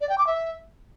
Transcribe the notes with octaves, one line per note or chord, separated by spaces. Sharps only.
D5
G5
D6
E5